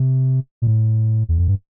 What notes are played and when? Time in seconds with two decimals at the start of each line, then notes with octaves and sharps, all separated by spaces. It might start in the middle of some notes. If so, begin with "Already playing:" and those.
Already playing: C3
0.62 A#2
0.67 A2
1.29 E2
1.38 F2
1.48 G2